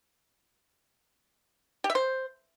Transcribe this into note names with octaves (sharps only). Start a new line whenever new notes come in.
G4
E5
C5